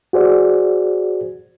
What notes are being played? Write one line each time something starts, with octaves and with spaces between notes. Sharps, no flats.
F#4 G#4 C5 D5